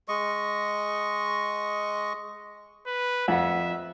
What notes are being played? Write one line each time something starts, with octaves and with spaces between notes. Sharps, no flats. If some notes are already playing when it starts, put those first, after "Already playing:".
G#3 D#5 C#6
B4
F2 E5 F#5